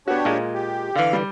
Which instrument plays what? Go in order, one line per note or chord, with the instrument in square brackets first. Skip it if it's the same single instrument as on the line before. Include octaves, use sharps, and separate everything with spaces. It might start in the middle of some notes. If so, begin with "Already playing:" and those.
[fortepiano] B3 F#4 [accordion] D4 G4 C#5
[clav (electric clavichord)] A#2 G#3 [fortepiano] F4
[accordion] G4
[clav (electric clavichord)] D3 E3 [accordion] F5
[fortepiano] G3